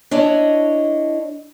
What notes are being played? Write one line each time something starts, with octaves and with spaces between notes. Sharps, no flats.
D4 E4 C#5 D#5